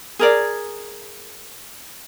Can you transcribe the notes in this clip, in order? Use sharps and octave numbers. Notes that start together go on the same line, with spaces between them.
G#4 A#4 D5